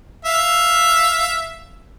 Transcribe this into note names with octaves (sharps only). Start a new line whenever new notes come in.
E5 F5